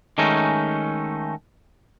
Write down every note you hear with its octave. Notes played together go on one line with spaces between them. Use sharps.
D#3 G#3 A3 C#4 D#4